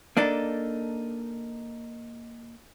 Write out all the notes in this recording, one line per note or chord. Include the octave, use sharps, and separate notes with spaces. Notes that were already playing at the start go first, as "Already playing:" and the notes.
A#3 D4 D#4 A4